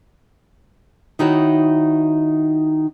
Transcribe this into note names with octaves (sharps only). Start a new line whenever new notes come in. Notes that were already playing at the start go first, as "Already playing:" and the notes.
D#3 D#4 E4 F#4 C#5